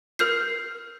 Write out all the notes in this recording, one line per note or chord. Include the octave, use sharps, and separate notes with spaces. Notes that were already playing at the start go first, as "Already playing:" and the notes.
A#4 F6 G6 C7